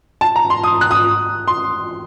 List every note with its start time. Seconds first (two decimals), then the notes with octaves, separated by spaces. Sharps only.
0.21 A5
0.36 A#5
0.50 C6
0.64 D#6
0.81 F#6
0.91 D#6
1.48 C6